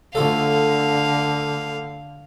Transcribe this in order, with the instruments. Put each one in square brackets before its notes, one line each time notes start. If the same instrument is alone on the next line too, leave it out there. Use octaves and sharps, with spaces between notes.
[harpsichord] D2 F4 A4 [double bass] D3 [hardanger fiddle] F5